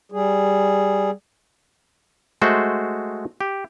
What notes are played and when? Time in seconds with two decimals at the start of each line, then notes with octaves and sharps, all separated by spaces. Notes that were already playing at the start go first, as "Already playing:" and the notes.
0.12 G3 G#4
2.42 G#3 A3 F#4 C5
3.41 G4